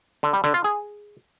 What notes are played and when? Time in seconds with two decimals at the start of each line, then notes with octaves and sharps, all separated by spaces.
0.23 D3
0.33 G3
0.44 D3
0.54 F4
0.64 G#4